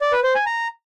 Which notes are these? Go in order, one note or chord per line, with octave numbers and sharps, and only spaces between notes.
D5
B4
C5
G#5
A#5